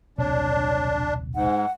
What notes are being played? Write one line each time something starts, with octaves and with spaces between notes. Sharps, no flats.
D#1 B1 C3 D4 C#5
G#2 F#5